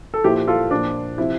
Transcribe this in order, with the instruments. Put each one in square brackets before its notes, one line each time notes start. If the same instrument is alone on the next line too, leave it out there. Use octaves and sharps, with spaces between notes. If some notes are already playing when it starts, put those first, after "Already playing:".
[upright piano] A4
A#2 F3 E4 G4
F4 A4
A#2 F3 D4
C3 F3 E4